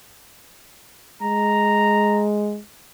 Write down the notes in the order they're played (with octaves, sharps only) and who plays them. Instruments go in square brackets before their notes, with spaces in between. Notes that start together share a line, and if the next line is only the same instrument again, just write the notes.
[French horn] G#3 [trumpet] A#5